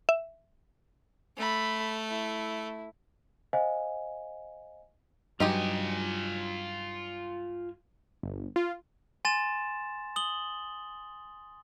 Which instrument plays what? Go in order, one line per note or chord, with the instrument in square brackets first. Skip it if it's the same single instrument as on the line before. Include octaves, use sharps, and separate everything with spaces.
[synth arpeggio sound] E5
[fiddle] A3 [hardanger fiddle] A4 B5
[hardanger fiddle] E4
[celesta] C5 D#5 F5 G#5
[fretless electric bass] G2 F#3 [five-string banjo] D#4 G4 D#5 [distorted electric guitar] F4 G#5
[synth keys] G1
F4
[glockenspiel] G#5 C6 A6 E7
D#6 F#7 G7